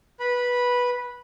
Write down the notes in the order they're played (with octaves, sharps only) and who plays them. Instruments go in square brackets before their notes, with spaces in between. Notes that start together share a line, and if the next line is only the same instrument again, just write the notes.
[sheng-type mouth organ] B4 B5